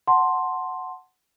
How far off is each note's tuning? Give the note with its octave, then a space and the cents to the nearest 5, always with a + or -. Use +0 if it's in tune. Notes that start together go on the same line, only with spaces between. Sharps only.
F#5 +0 A5 +0 C6 +5